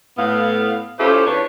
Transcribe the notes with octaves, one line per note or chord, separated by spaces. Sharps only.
A2 B3 F5
C#4 E4 F4 G4 A4 C5
E2 D4 B4 C#5